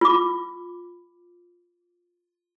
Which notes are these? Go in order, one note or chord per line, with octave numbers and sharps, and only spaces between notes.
F4 D6